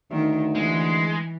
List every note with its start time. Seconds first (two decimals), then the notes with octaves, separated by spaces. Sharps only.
0.11 D2 D#3
0.55 E3 G#3